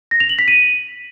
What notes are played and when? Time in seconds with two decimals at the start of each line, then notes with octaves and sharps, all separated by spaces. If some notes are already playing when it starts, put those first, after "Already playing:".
0.11 A#6
0.20 F7
0.29 F#7
0.39 B6
0.48 D#7